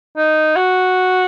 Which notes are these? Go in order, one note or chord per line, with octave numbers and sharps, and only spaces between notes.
D#4
F#4